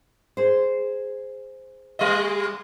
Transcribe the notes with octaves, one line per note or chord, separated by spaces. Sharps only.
G#4 C5
G3 G#3 D#5